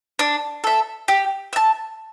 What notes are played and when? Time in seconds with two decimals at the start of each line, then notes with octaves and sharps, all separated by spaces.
0.19 D4
0.64 A4 E5
1.08 G4
1.53 E5 A5